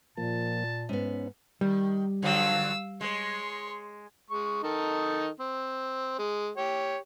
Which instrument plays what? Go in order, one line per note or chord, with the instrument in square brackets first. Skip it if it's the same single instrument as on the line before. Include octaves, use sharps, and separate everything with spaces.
[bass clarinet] A#2 [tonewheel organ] F3 A#3 [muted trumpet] A5
[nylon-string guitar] G#2 B3 [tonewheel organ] C#4
[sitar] D#3 [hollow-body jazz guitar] G3
[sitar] D3 F3 F#3 [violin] F5 E6
[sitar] G#3 [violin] C#5 C6
[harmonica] G#3 C#6
D#3 D#4 A4
C4
G#3
G4 C#5